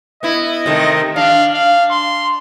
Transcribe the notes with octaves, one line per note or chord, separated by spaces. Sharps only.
B3 E4 D#5
C3 D#3 A3
D4 F5
F5
C6